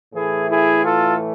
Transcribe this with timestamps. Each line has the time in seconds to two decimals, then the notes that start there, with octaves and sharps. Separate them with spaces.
0.13 A2 E3 A3 E4 G#4
0.49 E4 G#4
0.84 F4 A4